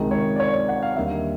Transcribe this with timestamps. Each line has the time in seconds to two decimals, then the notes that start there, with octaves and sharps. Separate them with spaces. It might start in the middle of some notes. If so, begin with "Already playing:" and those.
Already playing: C#2 C3 D#3 G#3
0.11 C#5
0.36 D5
0.40 C#5
0.54 C#5
0.69 F#5
0.83 F5
0.96 D#2 D3 G3 E5